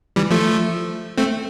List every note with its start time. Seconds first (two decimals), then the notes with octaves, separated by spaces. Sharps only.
0.16 E3 G3
0.31 F3 A3
1.17 A3 C4